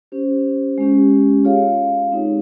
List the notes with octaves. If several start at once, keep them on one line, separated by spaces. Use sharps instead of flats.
C#4 G4 C5
G#3 C#4 G4
F4 G#4 C#5 F5
G#3 C4 D#4 G4